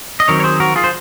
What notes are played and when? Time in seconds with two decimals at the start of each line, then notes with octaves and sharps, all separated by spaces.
0.20 D#5
0.28 D#3 F#3 C4 A#4 C#5
0.40 C#5
0.44 G#4 C5
0.60 F#4 A#4
0.76 F4 G#4
0.84 C5